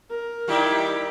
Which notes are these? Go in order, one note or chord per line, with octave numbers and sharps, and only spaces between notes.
A#4
G3 D#4 E4 G4